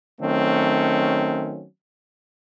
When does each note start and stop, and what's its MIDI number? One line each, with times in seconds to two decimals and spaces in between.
0.20 1.65 51
0.20 1.65 54
0.20 1.65 57
0.20 1.65 60
0.20 1.65 61